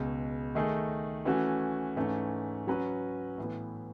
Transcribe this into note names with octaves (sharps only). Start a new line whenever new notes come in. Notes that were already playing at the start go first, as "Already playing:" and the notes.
Already playing: C#2 B2 G#3
D#3 A3 D#4 G#4
E3 A3 C#4 F#4
G#2 E3 A3 C#4
F#3 C#4 F#4 B4
A2 E3 B3